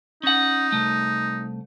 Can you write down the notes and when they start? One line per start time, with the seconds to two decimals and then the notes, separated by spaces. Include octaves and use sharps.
0.23 C#4 D#4 F#5
0.72 C2 A3